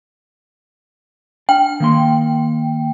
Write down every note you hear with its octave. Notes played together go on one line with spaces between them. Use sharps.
D4 G5
D#3 A#3 C6